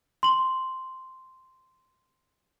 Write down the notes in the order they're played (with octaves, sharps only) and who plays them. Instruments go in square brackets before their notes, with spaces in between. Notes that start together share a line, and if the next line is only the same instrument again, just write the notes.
[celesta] C6 F#7